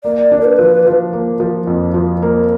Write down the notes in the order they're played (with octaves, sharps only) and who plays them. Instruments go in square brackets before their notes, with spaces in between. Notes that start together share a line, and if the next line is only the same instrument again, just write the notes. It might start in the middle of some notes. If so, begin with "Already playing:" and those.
[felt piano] A#3 [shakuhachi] D5
[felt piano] D4
[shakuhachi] A#4
B4
[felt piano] F3
F3
A#3
F3
F2
F3
A#3